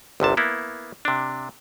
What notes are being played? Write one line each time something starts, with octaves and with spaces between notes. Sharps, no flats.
G1 C2 C3 A5
A#3 B3 E4
C3 D4